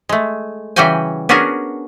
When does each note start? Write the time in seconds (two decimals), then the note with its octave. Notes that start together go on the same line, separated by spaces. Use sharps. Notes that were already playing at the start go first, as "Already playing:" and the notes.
0.09 G#3 A3
0.76 C#3 E3 G3 F#4 G5 G#5
1.29 B3 C#4 D4 F#4 G#4 A#4